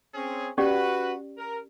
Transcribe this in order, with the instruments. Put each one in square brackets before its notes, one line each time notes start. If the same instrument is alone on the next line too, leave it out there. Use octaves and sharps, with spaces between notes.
[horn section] C4 C#4 G#4
[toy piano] C#4 G4 D5 [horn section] F#4 B4
[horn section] A#4